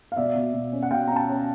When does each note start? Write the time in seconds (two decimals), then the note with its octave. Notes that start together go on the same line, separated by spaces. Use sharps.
0.12 F5
0.17 B2 D5 E5
0.35 B2
0.54 B2
0.72 C#4
0.83 F#5
0.91 B2 F5 G5
1.08 C#4 A#5
1.16 G5 A5
1.29 C#4